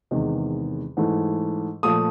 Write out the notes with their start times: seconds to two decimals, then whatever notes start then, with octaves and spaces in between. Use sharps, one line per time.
0.11 E2 C3 D#3 G#3
0.97 G#2 E3 A3
1.83 A#2 F3 A3 D#6